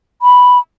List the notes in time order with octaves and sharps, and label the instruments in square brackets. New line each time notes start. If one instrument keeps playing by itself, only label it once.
[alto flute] B5